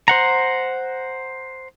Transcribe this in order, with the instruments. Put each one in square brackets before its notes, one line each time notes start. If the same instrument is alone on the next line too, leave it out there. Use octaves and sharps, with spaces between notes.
[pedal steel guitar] C5 F#5 A#5